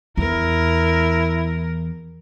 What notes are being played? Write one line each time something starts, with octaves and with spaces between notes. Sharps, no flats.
E2 E4 A#4